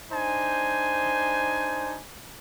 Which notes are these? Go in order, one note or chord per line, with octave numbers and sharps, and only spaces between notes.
D4 D#4 C5 G#5